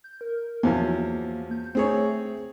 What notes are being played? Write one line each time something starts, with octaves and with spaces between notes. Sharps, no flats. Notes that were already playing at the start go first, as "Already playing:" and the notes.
G6
A#4
E2 F3 F#3 A#3
G6
A3 C4 G#4 C#5